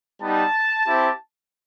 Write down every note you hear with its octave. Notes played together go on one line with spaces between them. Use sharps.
G3 B3 D#4 A5
C4 E4 G4